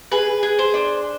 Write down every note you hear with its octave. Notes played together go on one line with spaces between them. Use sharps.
G#4 B4
G#4
C5
D4